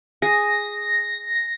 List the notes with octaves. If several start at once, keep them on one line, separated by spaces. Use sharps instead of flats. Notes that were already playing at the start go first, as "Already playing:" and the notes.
G#4 A#6
A#6